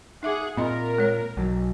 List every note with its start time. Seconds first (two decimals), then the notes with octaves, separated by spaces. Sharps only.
0.23 D#4 G#4 E5 F#5 D6
0.57 A#2 C4 A#4 D#5 C6
0.98 G#3 C#5
1.37 B1 F#3